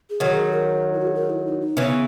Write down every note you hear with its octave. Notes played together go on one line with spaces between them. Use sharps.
G#4
D#3 F#3
G#4
A#4
E4
F#4
G#4
A#4
E4
D#4
D#4
C#3 E3 B3